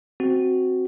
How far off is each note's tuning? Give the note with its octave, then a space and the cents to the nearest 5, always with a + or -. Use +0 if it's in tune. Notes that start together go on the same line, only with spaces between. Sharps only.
C4 +0 F#4 +0